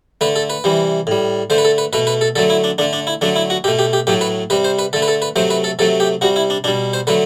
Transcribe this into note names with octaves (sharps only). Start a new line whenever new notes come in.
D3 A3 B4
A4
B4
C3 E3 G3
A2 G3
D3 A3 C5
B4
A4
B4
B2 A3 B4
B4
A4
D3 F#3 A3 A4
E4
D4
D3 A3 D4
D4
E4
D3 F#3 A3 D4
E4
F#4
B2 A3 G4
G4
G4
A2 F#3 A3 G4
B4
C3 G3 B4
C5
B4
D3 A3 A4
B4
A4
B4
C3 F#3 A3 C5
B4
A4
C3 F#3 A3 A4
G4
C3 G3 F#4
E4
D4
B2 G3 D4
C5
D3 F#3 A3 B4